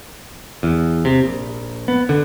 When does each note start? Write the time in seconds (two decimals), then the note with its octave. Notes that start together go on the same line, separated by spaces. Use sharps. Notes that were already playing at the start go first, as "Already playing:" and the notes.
0.63 E2
1.05 C3
1.24 A#1
1.88 B3
2.09 D3